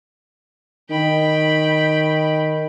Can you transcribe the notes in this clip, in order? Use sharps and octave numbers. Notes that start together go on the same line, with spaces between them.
D#3 G5 B5